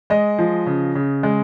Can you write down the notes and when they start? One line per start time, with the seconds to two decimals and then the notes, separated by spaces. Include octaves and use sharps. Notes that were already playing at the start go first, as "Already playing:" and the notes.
0.10 G#3 D#5
0.38 F3
0.66 C#3
0.95 C#3
1.23 G#3